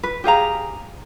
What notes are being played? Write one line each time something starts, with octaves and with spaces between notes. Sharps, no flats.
B4
G4 G#4 F5 A#5